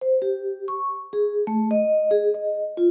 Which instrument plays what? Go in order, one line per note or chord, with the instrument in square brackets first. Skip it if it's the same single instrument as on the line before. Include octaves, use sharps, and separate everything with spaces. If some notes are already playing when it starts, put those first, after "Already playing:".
[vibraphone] C5
G4
C#6
G#4
A3
D#5
G#4
D#5
F4